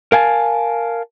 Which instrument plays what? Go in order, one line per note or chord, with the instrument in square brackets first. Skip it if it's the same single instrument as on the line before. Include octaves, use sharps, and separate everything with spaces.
[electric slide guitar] A#4 F5 G#5 A5